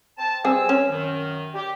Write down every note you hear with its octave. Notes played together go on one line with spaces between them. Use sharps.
C4 A5
G3 C4 G#4 G#5 E6
C#4
F#2 D#3
G4